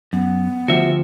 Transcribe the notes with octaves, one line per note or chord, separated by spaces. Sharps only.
F#2 B3
D2 F3 F#4 G4 E5